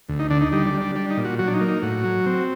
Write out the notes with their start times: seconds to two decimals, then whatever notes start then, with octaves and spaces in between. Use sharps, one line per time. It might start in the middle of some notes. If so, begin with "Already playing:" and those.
0.09 D2
0.19 D#4
0.30 D3 D4
0.41 D#4
0.52 G3 D#4
0.67 D4
0.74 G3
0.81 D4
0.95 G3 D4
1.10 D#4
1.17 A#2
1.25 F#4
1.39 F#3 F#4
1.47 D4
1.54 D#4
1.61 A#3
1.68 D#4
1.83 A2 F#4
2.04 F#3
2.26 C4